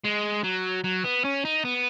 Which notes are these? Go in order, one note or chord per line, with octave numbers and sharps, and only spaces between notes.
G#3
F#3
F#3
B3
C#4
D#4
B3